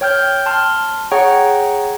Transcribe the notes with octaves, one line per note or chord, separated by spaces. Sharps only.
C#5 G5 F6 G6
A5 C6 F6
G#4 C#5 F#5 G5 A#5 C#6